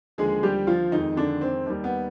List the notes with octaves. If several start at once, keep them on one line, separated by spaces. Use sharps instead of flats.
D#2 D3 F3 G#3 G#4
G3 G4
F3 F4
F2 D#3 G#3 D#4
D3 D4
C4
D#2 D#3 G3
B3